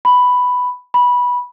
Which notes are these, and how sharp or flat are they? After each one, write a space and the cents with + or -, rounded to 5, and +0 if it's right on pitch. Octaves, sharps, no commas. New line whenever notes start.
B5 +5
B5 -15